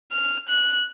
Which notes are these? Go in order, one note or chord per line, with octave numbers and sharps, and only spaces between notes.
F6
F#6